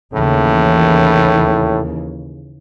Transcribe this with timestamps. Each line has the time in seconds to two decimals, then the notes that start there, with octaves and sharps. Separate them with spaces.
0.14 D#2 A2 C#3 E3